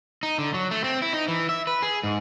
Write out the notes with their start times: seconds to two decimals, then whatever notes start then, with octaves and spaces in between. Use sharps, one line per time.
0.23 D#4
0.38 D3
0.54 F#3
0.71 A3
0.84 C4
1.02 E4
1.13 D#4
1.28 E3
1.49 E5
1.67 B4
1.82 G#4
2.03 G#2